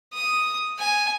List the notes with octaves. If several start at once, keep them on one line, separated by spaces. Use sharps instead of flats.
D#6
G#5